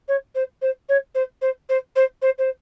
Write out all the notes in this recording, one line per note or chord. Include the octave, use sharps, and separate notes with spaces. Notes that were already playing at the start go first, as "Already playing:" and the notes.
C#5
C5
C5
C#5
C5
C5
C5
C5
C5
C5